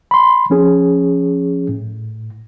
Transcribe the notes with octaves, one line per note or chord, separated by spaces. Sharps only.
B5 C6
F3 C#4 G#4
A2